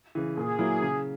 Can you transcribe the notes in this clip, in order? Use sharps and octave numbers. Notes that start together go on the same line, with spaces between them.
C#3 E3
A#2 G#4
F#3 A#3 E4
C#3